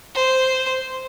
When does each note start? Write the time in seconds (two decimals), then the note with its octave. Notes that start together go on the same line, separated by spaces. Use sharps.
0.15 C5